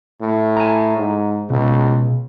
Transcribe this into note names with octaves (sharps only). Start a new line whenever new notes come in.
A2
G#5 A#5
G#2
C#2 B2